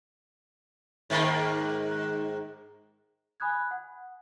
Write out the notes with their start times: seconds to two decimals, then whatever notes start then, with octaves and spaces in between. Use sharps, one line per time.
1.10 G#2 D#3 A#3
3.40 G#5 B5 D#6 F#6 G#6
3.71 F#5